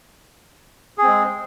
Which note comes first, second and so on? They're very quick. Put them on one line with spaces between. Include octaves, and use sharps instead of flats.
G#4 C4 G#3